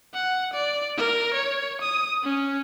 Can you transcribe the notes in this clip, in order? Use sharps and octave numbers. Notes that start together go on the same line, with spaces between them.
F#5
D5
A#4
C#5
D#6
C#4